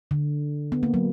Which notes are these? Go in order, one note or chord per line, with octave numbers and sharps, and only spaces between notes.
D3
B3
A#3
F#3